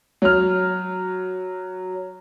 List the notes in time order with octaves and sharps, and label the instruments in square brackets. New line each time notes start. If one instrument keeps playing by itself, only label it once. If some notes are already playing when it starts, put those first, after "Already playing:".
[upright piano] F#3 F6